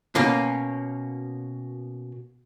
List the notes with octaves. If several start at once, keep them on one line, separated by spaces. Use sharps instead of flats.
B2 A#3 C#4